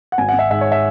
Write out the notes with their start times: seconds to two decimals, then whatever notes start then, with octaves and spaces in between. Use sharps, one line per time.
0.12 F#5
0.18 G#1 G#5
0.29 F#5
0.33 G#1
0.39 E5
0.50 G#2 E5
0.61 C#5
0.72 E5